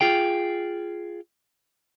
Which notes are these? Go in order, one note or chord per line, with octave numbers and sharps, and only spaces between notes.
F4 G#4 G5